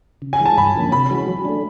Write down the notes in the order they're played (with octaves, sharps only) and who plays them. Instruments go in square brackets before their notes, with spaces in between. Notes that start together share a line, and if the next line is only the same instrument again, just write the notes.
[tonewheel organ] C#3
[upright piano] G#5
[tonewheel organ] E3 G#3
[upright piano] A5
[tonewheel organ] G2 [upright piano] B5
[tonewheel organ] D3 F3 A#3 C#4
[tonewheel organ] C3 [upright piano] B5
[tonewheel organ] E3 G#3 C#4 F#4
F#3
A3 D4